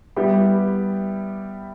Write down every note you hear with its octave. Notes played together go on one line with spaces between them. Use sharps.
G3 B3 E4 G4